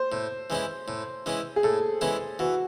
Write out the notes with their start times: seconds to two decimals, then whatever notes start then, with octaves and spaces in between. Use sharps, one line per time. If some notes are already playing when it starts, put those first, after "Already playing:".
Already playing: C5
0.12 A2
0.50 E3 G#3 C#4 E4
0.88 A2
1.26 E3 G#3 C#4 E4
1.56 G#4
1.63 A2 A4
2.01 E3 G#3 C#4 E4
2.39 E3 F#4